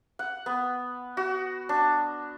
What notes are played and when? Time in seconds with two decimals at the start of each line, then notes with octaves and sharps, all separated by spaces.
0.19 F#5
0.46 B3
1.17 F#4
1.69 D4